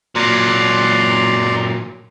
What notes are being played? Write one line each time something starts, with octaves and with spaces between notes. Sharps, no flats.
A#2 F#3 D5 A#5 C6